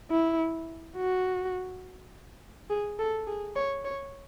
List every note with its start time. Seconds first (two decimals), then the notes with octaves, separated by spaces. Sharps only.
0.11 E4
0.97 F#4
2.70 G#4
2.99 A4
3.27 G#4
3.56 C#5
3.85 C#5